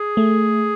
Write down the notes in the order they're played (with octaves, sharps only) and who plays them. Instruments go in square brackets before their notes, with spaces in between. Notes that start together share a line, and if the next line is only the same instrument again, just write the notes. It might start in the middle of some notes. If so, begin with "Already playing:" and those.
Already playing: [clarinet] G#4
[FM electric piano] A3